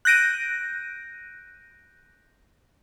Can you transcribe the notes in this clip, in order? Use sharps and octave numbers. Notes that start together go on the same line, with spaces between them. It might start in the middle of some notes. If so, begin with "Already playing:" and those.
F#6 G6 A#6 D7 D#7